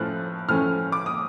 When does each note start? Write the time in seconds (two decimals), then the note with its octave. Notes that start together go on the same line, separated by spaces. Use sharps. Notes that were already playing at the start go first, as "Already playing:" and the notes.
Already playing: A2 F3 A3 C#4 F6 F#6
0.48 A2 F3 A3 C#4 F6
0.92 D6
1.06 D#6